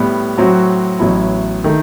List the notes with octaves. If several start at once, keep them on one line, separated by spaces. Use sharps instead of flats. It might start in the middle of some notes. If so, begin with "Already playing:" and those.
Already playing: A2 G3 B3
A2 F#3 C4 F#4
A1 A2 F#3 B3 E4
D#3 A3